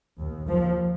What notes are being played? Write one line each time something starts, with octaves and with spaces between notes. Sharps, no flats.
D#2
D#2 F3